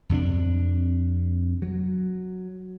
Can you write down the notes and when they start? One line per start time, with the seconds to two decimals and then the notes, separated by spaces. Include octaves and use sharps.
0.09 F2 C3 B3 D4
1.62 F#3